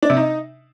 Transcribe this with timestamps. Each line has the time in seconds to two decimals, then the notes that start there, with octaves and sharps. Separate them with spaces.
0.03 D4
0.10 C3
0.17 D#4